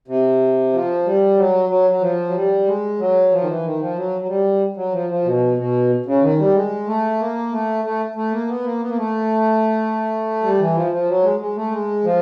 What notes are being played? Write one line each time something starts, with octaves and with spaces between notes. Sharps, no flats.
C3
F3
G3
F#3
F#3
F#3
F3
F#3
G3
G#3
F#3
F3
D#3
E3
D#3
F3
F#3
F#3
G3
F#3
F3
F3
B2
B2
C#3
D#3
G3
G#3
A3
A#3
A3
A3
A3
A#3
B3
A#3
B3
A#3
A3
G3
E3
F3
F3
F#3
G#3
G#3
A3
G#3
F3